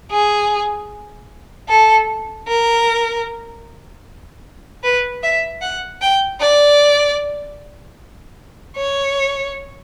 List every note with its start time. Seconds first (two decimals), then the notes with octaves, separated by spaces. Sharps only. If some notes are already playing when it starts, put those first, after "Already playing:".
0.11 G#4
1.69 A4
2.48 A#4
4.83 B4
5.23 E5
5.62 F#5
6.01 G5
6.41 D5
8.76 C#5